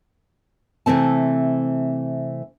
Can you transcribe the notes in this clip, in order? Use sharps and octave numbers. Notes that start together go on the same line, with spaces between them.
C3 E3 A3 C4 A5